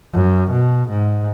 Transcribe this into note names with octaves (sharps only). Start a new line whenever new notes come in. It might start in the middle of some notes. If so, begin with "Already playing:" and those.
F#2
B2
G#2